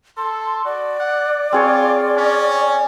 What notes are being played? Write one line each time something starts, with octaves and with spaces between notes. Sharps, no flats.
A4 C6
F#4 D5
F#5
C4 F4 G#4 C#5
C#4